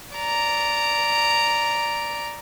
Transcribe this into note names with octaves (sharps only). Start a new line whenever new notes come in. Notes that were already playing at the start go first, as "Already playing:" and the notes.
D5 A#5